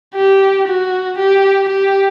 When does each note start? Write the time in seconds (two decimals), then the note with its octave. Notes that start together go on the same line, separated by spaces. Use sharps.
0.15 G4
0.68 F#4
1.18 G4
1.69 G4